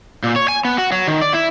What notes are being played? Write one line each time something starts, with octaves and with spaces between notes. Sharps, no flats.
A#2
C#5
G#5
B3
F#4
F#3
D#3
D5
E4